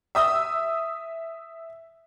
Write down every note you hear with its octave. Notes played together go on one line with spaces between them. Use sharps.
E5 D#6 E6